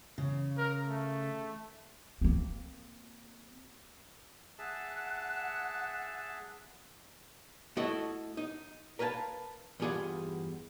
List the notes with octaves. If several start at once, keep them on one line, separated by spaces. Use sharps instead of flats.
C#3
A#4
A3
A#3 C4
G#4 E5 F#5 A5 F#6
A3 E4 F#4 A4 D#5
D#4
A#4 B4 F5 G5 A5
E2 G2 F4 G#4 D5 F#5